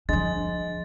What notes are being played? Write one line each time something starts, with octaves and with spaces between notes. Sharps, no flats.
F3 G#3 D4 A6